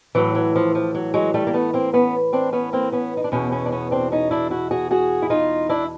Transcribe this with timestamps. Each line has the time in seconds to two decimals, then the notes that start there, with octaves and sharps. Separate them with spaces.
0.15 A2 E3 F#3
0.35 F#3
0.56 F3
0.75 F3
0.95 F#3
1.14 F#3 G#3
1.34 G3 A3
1.47 A#3
1.53 A3 B3
1.74 A#3 C4
1.93 B3 C#4
2.33 C4 D4
2.52 B3 C#4
2.73 A#3 C4
2.92 B3 C#4
3.17 D#4
3.24 D4
3.32 E2 B2 B3 C#4
3.52 B3 C#4
3.66 D4
3.72 B3 C#4
3.91 C4 D4
4.12 C#4 D#4
4.31 D4 E4
4.50 E4 F#4
4.71 F#4 G#4
4.91 F#4 G#4
5.22 E4
5.30 D#4 F4
5.69 D4 E4